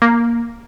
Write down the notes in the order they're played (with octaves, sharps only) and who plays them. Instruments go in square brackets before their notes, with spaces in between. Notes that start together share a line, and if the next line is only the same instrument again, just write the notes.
[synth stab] A#3